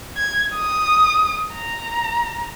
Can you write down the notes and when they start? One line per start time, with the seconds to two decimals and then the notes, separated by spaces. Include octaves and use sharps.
0.17 G#6
0.55 D#6
1.55 A#5